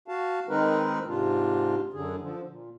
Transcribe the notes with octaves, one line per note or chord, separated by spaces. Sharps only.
F#4 F5 A5
D#3 G#3 C4 D#4 A#4 B4
G#2 C3 D4 F4
F#2 D3 G#4
D3 F3
A#2